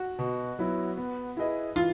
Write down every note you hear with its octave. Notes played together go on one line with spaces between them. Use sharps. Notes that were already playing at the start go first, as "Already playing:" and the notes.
Already playing: F#4
B2
F#3 B3 E4
B3
E4 G#4 B4 D#5
E3 F4